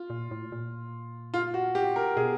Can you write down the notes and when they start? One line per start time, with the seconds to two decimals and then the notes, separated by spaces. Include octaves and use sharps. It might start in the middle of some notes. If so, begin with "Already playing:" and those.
Already playing: F4
0.10 A#2
0.31 A2
0.52 A#2
1.34 F4
1.54 F#4
1.75 G4
1.96 A#4
2.17 B2 G#4